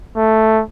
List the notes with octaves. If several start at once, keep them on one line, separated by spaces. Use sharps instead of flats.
A3